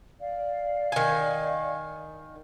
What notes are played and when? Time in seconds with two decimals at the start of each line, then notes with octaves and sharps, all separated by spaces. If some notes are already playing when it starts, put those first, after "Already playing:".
0.21 D5 F5
0.92 D#3 G#5